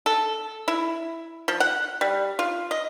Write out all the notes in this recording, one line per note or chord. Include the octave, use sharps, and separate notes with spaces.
A4
E4
F3
F#5
G3
F4
D#5